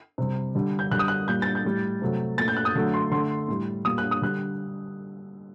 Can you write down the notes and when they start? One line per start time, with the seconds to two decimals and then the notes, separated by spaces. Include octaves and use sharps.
0.18 C3 G3
0.55 D3 G3
0.79 G6
0.91 D3 G3 F#6
0.99 D#6
1.08 F#6
1.28 A#2 G3 G6
1.42 A6
1.55 G6
1.65 A2 G3
2.02 C3 F#3 A3
2.38 A#2 A3 A6
2.48 G6
2.57 F#6
2.65 D#6
2.75 D3 F#3 A3
2.94 C6
3.11 D3 A3 C6
3.48 A2 G3
3.85 A#2 G3 D#6
3.98 F#6
4.11 D#6
4.21 D3 G3 F#6